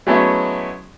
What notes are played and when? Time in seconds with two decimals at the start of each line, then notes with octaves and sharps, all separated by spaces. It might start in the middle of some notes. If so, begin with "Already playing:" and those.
0.07 F#3 G#3 A3 B3 C#4 E4